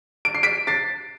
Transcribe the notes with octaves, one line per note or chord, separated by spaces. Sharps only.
D7
C7
B6 D7
A6 C7